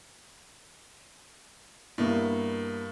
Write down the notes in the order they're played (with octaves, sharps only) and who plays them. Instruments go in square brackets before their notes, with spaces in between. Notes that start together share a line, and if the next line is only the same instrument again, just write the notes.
[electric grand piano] G2 [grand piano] A#3 B3 E4